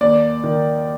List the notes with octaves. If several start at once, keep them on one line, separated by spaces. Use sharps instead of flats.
D#2 D5
D#3